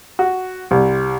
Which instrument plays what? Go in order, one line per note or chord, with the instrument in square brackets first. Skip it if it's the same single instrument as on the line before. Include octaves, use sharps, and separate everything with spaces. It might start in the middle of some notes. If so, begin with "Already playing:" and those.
[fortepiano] F#4
C2